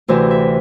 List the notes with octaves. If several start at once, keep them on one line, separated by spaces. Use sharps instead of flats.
D2 C3 E3
E5